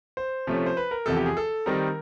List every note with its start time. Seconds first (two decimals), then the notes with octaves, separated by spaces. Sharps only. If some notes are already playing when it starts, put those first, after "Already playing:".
0.17 C5
0.47 C3 F3 A3 C#4
0.66 C5
0.77 B4
0.91 A#4
1.06 E2 C3 F3 A4
1.17 G4
1.26 G#4
1.37 A4
1.66 D#3 G3 C4 D#4 A#4